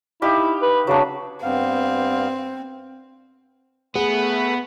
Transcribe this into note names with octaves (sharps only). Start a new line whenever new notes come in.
D#4 E4 G4 F5
B4
C#3 F#3 D4
G2 B3 C4 F5
A3 B3 G#4 B4